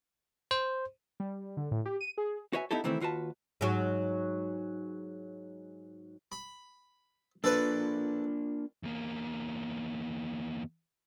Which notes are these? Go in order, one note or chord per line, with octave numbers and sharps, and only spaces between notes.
C5
G3
D3
A2
G4
D#7
G#4
F#4 B4 C#5 E5 G#5
B3 D#4 E4 G4 A4
C3 D#3 E3 A3 C4 E4
D#2 F4 F#4 B4 A5
G#2 F#3 F#4
B5
A#3 D4 F4 A4 B4
E2 A#3